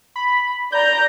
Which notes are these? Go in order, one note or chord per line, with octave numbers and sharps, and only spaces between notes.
B5
D5 A#5 G6